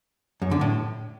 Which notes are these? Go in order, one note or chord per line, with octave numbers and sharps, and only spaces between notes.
F#2
D3
A2